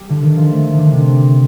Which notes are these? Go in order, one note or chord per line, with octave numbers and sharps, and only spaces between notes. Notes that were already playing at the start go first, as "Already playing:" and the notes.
Already playing: G3
D3
D#3
F3
A3
A3
D3 D#3
C3